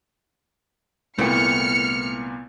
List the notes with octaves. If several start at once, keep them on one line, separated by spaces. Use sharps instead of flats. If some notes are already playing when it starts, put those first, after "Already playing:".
C2 A#2 A3 B3 E4 G5 F6 C#7